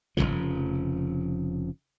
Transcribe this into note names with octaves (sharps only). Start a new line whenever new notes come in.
F1 D#2 C#3 F3